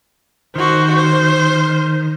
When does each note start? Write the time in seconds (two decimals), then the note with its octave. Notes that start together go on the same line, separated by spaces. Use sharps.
0.56 D#3 F#4 C5
0.95 C5